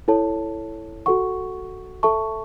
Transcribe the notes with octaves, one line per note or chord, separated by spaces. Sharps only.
E4 A4 C#5 A5
F#4 A4 F#5 C#6
A4 E5 A5 C#6